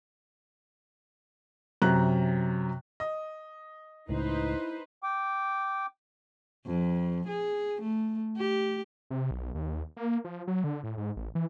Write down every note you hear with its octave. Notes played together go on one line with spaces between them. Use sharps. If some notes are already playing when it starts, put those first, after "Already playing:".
F#2 C3 A#5 F#6
D#5
C#2 A2 D#4 E4 B4 C5
G5 D6
F2
G#4
A3
G4
C3
B1
D#2
A#3
F3
F#3
D3
A2
G#2
A1
E3